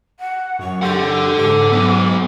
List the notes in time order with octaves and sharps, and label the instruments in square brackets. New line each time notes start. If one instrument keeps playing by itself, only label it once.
[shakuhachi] F#5
[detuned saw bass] F#2 [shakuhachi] C#6
[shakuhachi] G4 [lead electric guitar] A4 F#5
[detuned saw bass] G#2 [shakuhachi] D6
[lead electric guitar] F#3 B3